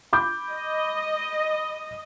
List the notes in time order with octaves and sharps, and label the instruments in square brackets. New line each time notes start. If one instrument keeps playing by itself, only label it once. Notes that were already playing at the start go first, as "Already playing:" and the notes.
[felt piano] B5 D6 G6
[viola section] D#5